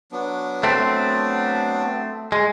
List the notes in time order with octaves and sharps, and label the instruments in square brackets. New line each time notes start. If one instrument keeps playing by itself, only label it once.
[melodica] F#3 B3 D4
[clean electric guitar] A3 C4
G#3